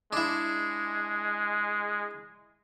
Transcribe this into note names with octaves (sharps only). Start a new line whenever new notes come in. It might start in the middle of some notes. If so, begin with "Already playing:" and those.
G#3 D4 E4